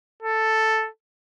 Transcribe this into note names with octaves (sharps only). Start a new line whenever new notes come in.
A4